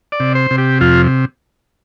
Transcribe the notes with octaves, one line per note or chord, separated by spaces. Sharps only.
D5
C3
C5
C3
G4
F2 F4